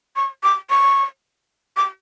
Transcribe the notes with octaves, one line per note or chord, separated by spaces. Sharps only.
C#6
D6
C#6
D6